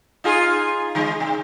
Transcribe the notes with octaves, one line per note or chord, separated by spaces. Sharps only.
D#4 F4 G#4
D3 G#3
C3